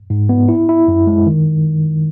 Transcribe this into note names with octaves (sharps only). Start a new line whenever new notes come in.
G#2
B3
E4
E4
F#2
G#3
D#3